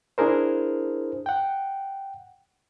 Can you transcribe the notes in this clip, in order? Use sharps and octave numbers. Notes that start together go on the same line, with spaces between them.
D4 E4 G#4 A#4 C5
F#5 G5